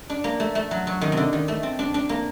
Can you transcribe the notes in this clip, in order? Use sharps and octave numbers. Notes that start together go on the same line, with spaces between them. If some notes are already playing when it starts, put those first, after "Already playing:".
D4
A#3
A3
A3
F#3
F#3
D#3
C3
D3
D#3
A3
C4
D4
D4
A#3